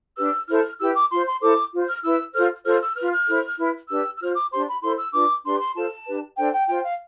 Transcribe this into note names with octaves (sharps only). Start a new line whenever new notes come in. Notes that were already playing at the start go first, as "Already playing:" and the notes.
D4 G4 B4 E6
E4 A4 C5 F6
E4 G4 B4 E6
D6
F4 C5 C6
C6
E4 A4 C5 D6
F4 C5
F6
E4 B4 E6
F4 A4 C5 F6
F4 A4 C5 F6
E6
F4 B4 F6
F6
E4 A4 C5
E4 B4
D4 G4 B4 E6
E6
F4 C5 F6
D6
D4 G4 C5 C6
B5
E4 A4 C5 C6
E6
D4 F4 B4 D6
D4 G4 B4 C6
C6
F4 A4 C5 A5
D4 G4 B4
D4 A4 C5 G5
G5
F4 C5 G5
F5